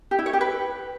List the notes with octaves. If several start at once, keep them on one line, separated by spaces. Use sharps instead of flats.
G4
E4
C#5
G4
B4